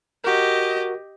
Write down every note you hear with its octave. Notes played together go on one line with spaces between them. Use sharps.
F#4 G4 A#4 D#5